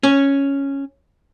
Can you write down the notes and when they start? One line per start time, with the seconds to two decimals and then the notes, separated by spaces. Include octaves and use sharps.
0.03 C#4